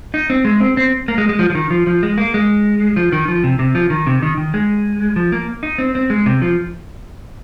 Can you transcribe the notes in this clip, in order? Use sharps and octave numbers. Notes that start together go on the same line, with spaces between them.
D#4
C4
G#3
C4
C4
A#3
G#3
G#3
F3
F3
D#3
F3
F3
G#3
A#3
G#3
F3
D#3
F3
C3
C3
F3
D#3
C3
D#3
D#3
G#3
F3
A#3
D#4
C4
C4
G#3
C3
F3